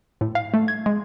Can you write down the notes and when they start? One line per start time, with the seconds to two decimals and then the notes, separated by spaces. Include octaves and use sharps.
0.21 A2
0.35 F5
0.54 A3
0.68 G#6
0.86 G#3